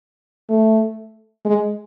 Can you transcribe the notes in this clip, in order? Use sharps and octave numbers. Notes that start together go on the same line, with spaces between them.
A3
G#3